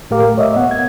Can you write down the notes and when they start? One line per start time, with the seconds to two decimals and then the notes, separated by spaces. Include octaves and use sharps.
0.10 A2 A3 G4 A#4 F5 D6
0.38 C#5 D#5 E5
0.56 B3 F#5
0.71 G#6